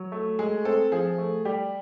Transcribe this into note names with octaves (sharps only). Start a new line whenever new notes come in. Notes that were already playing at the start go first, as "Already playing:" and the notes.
Already playing: F#3
A3
G#3 G#4
C4 A4
F3 G#4
A3
G3 G4